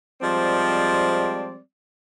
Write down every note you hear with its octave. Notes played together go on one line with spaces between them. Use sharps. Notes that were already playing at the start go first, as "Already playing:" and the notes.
F3 G3 G#3 C4 D5